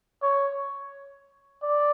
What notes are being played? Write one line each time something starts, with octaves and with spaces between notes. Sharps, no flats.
C#5
D5